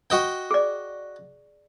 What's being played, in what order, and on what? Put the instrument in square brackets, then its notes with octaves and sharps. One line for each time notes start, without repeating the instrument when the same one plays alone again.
[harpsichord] F#4 D#5 G5
[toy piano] G#4 D5